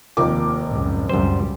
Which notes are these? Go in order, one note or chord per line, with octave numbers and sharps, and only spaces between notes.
F1 D#2 D#3 F4 A#4 D6
C#2 F#2 A2
C#2 F#2 G3 C5